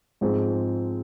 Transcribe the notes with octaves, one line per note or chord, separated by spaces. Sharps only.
G#2 F3 G#3 C4